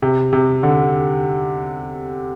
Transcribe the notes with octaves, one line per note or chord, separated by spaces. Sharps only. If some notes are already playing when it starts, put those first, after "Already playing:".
C3
C3
D3